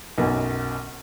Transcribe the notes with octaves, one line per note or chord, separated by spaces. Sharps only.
B1 F#2 B2